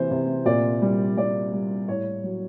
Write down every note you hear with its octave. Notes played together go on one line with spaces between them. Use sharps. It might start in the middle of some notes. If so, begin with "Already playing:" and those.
Already playing: C3 E3 C5
C3
A#2 D5
G3
G3 D5
G3
A2 C#5
F#3